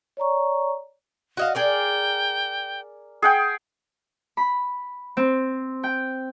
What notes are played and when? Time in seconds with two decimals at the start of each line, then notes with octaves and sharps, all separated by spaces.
0.17 C#5 D5 A#5 C#6
1.37 F#4 D#5 F5
1.55 G#4 A#4 D5 G5
3.22 G#4 F#5 G5
4.37 B5
5.17 C4
5.83 G5